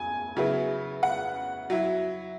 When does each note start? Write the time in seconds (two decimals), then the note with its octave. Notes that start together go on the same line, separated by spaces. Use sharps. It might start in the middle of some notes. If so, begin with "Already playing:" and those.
Already playing: G#5
0.36 C#3 F#3 B3 E4
1.03 F#5
1.70 F#3 E4